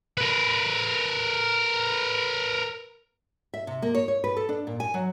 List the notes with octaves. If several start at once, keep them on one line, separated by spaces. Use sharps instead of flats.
A#4 B4
E5
C3
A#3
C#5
C#5
B4
A4
D4
A#2
G#5
F#3